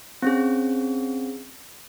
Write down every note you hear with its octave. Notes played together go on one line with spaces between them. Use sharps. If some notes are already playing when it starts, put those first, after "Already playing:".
C4 C#4 G#4